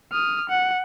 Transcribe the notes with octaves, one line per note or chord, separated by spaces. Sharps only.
D#6 F6
F#5